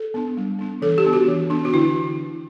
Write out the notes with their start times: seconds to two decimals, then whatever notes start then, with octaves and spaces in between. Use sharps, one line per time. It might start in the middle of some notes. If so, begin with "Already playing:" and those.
Already playing: A4
0.14 B3 D4
0.37 G3
0.59 B3 D4
0.82 E3 A4
0.98 G4
1.04 B3 D4
1.13 F#4
1.28 E3
1.50 B3 D4
1.65 F#4
1.73 D3 E4